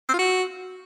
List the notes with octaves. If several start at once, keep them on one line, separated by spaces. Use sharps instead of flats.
C4
F4
F#4